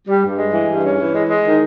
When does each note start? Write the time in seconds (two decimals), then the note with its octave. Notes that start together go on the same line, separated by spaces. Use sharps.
0.08 G3
0.23 G2
0.38 G#3
0.53 E3
0.68 G2
0.84 C#4
0.99 E3
1.15 G#3
1.29 G#3
1.45 D#3